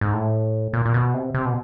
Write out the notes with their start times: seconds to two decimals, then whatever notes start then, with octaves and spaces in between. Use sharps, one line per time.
0.01 G#2
0.13 A2
0.73 A#2
0.86 A#2
0.94 B2
1.14 C3
1.34 C3
1.46 B2